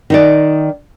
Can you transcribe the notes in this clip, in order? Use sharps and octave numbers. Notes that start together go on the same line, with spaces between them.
D#3 D#4 D5